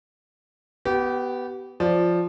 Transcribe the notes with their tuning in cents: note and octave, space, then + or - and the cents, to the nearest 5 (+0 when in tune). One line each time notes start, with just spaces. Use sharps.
B3 +0 G4 -25
F3 +0 D5 +0